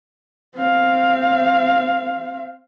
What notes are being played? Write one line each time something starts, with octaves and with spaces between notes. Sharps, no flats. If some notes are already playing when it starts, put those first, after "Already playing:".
C4 F5